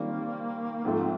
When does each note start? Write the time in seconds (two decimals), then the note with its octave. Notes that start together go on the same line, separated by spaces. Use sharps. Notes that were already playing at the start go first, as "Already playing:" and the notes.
Already playing: D#3 G3 A#3 C4 F4
0.84 G#2 F3 A3 C4